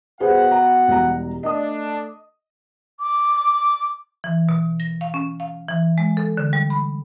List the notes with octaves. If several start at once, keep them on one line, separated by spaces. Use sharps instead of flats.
B2 G#4 B4 C5 F#5
A#5
E1 G3 A#5
A3 D4 D#5 D#6
D6
E3
B2
A#6
F5
C#4
F5
E3
G#3
A4
D3
G3
B5